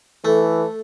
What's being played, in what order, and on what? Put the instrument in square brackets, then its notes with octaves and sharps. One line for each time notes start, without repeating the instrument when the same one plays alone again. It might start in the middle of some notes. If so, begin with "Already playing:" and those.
[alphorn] E3 [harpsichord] A3 [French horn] A4